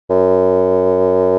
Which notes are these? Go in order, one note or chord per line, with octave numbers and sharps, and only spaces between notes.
F#2